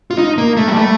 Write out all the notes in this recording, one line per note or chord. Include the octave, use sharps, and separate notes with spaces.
F4
D#4
A#3
A3
G3
A3